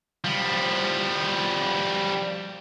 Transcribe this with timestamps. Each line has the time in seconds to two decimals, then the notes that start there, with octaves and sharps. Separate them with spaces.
0.24 F3 G3